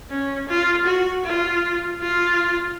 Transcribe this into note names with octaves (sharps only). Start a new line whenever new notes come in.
C#4
F4
F#4
F4
F4